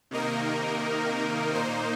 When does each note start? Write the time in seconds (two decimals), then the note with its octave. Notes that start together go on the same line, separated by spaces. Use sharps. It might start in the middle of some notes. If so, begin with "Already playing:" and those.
0.11 C3 D#3 A#3 D#4 A#4
1.55 A#2 A#3 D#4 C5